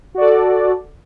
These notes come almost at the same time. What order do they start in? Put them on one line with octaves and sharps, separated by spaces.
F#4 D5 A4